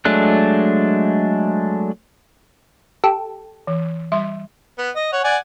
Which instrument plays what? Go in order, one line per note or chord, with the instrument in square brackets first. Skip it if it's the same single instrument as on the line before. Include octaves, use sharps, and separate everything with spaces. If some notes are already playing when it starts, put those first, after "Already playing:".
[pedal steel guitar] F#3 G#3 A3 D4 F#6
[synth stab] G4 A4
[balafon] E3
G3 E5 C6
[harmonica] B3
D#5
C#5 F#5
D5 F#5 G#5